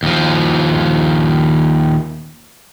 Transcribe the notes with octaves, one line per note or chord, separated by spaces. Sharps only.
D#2 F3